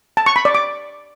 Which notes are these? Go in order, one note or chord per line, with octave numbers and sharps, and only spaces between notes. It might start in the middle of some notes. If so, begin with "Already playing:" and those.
A5
C#6
B5
D5
D6